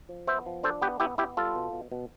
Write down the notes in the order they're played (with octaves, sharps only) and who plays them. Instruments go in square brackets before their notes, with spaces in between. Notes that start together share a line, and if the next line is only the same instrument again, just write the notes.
[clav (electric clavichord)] F3
B3 C5 E5
F3
D4 A4 C5
B3 G4 B4
B3 E4 G4
B3 E4 G4
G3 F4 A4
B2
B2
B2